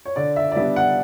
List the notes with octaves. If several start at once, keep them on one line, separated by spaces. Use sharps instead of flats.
C#5
D3 D5
E5
D5
G3 B3 D4 E5
F#5